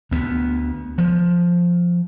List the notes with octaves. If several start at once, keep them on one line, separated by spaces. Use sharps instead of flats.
D2 B3
F3